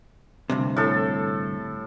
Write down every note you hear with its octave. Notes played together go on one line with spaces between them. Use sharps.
D2 G2 C3
A2 A4